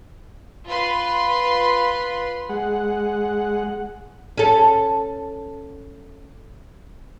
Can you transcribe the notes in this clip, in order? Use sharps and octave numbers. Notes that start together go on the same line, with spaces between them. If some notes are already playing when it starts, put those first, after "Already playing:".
F4 B4 B5 C6
G#3 F#5
C#4 A4